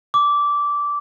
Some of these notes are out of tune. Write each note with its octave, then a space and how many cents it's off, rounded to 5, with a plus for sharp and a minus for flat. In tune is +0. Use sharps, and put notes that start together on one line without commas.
D6 -15